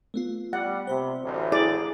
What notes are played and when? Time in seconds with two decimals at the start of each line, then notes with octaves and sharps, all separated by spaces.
0.14 A3 B3 F4
0.53 G3 F#5
0.87 C3 C5 B5
1.24 A1 D2
1.52 E4 G#4 D5